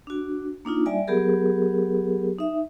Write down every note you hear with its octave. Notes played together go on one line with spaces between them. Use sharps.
D4 F#4
A#3 D4 D#4 F4
G3 D5 E5 G#5
F#3 B3 G4 G#4 A#4
D#4 E5